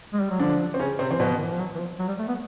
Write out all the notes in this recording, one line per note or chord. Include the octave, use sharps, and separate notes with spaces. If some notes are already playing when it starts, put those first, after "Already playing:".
G#3
G3
F#3
D3 F3 D4
C4
C#3 C#4
C3 C4
E3 C4
B2 F3 B3
D#3
E3
F3
F#3
E3
F3
F#3
G3
A3
B3